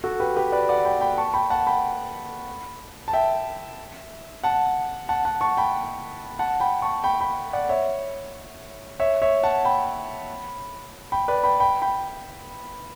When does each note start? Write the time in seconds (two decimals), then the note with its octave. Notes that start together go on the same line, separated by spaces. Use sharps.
0.04 F#4 A4
0.20 G4 B4
0.36 G4 B4
0.52 B4 D5
0.69 D5 F#5
0.85 G5 B5
1.01 G5 B5
1.18 A5 C#6
1.34 G5 B5
1.50 F#5 A5
1.67 G5 B5
3.08 A5
3.13 E5 G5
4.44 F#5 A5
5.09 F#5 A5
5.25 F#5 A5
5.41 A5 C#6
5.57 G5 B5
6.39 F#5 A5
6.60 G5 B5
6.82 A5 C#6
7.04 G5 B5
7.20 G5 B5
7.53 D5 F#5
7.69 C#5 E5
9.00 C#5 E5
9.22 C#5 E5
9.43 F#5 A5
9.65 G5 B5
11.12 G5 B5
11.28 B4 D5
11.44 G5 B5
11.60 G5 B5
11.82 G5 B5